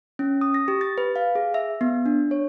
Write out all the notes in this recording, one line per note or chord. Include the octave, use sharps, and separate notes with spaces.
C#4
D#6
A#6
G4
A6
B4
F5
G#4
E5
B3
D4
C#5